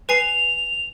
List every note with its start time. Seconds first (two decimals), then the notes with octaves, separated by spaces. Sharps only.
0.09 B4 G#5 C7 F7